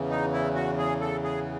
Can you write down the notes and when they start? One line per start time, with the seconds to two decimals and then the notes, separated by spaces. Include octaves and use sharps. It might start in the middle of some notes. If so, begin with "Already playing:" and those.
Already playing: E2 C#3 E3
0.10 D#4
0.33 E4
0.55 F#4
0.78 G#4
1.01 A4
1.24 G#4